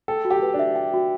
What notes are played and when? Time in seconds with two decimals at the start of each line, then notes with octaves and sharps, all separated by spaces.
0.08 A4 G5
0.25 F#4
0.31 G4
0.42 B4
0.54 D4
0.59 E5
0.76 G5
0.94 F#4